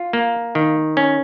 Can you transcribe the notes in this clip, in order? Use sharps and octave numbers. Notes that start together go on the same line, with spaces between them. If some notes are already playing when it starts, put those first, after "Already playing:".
Already playing: F4
A#3
D#3
C#4